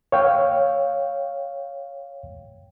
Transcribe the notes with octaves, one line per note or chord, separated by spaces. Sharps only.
C#5 F5 G5